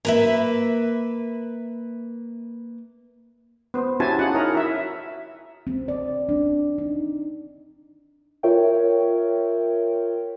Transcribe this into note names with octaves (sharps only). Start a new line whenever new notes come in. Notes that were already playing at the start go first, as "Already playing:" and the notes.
A#3 B4 E5
B3 C5
C#4 E4 F#4 G4 G#5 A5
D#4 F4 F#4 G#4 F#5
E4 A#4 C#5 D#5 A#5
E4 F#4 E5
C4
D5
D4
D#4
F4 A#4 C#5 E5 G5